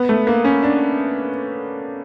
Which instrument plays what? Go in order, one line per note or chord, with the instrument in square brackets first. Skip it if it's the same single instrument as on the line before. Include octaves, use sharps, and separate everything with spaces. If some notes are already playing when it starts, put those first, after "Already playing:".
Already playing: [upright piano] B3
A3
A#3
C#4
D4